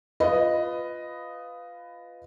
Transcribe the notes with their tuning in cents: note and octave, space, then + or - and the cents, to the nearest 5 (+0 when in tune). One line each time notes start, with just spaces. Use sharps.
F4 +0 B4 +15 D#5 +0